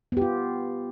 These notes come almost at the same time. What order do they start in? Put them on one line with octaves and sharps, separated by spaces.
B3 G4 F4